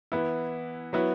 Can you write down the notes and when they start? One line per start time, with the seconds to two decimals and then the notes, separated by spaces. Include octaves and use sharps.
0.12 E3 B3 E4
0.93 F#3 B3 E4